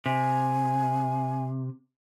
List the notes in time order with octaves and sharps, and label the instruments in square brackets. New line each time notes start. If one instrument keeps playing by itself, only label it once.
[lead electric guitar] C3 [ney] G#5